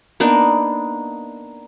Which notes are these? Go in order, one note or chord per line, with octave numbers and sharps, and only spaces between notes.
A#3 B3 D4 D#4